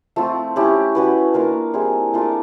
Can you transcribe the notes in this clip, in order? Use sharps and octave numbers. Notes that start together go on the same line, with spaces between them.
F3 A3 C4 F4
A3 C#4 E4 G4
C#4 F#4 B4
A#3 D4 F4 A#4
G3 C4 E4 G#4
A3 D4 F4 A#4